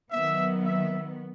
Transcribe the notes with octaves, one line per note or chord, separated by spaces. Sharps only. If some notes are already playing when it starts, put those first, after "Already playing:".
D#3 F#3 B3 E5
E5